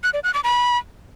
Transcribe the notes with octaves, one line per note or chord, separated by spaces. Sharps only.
F#6
D5
F#6
D6
B5